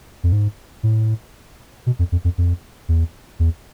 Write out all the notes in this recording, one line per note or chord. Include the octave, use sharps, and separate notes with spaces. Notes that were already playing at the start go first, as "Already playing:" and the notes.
F2
G#2
A2
B2
F2
F2
F2
F2
E2
E2